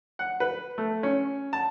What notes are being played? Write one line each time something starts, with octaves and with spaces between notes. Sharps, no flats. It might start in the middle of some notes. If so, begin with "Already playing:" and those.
F#5
B4
A3
C#4
A5